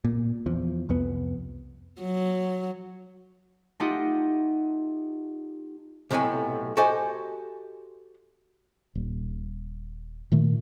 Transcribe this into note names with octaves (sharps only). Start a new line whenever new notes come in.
A#2
E2 F3
C2 F2 B3
F#3
A3 D#4 F4 G4 D#5 F#5
B1 A2 C3 F#3 G5 G#5
F#4 G4 A4 C5 D#5 G#5
D#1
A#2 D#3 A3